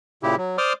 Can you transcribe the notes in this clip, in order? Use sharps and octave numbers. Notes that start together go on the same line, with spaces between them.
A#2 C#3 E4 G4
F#3
C5 D5 C6 D6 D#6 F6